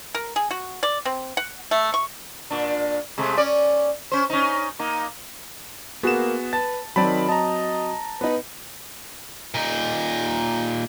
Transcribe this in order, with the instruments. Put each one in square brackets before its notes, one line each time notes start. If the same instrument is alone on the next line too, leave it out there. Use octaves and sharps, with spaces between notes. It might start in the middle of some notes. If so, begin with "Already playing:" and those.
[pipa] A#4
G#4
F#4
D5
C4
F#5
A3
C#6
[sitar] A#2 D4
C3 G#3 A3
C#4 D5
C#4 C5
C#4 D#4
A#3 D#4
[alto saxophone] A#3 [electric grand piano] B3 E7 [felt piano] F#4 G#4
[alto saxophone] B4 [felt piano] A5 [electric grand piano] A6
[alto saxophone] D#3 [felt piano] F#3 C4 [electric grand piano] D5 A5 B5
[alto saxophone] D#5 [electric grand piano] A5 A#5
[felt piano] B3 D#4 [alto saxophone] B4
[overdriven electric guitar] A#2 D#4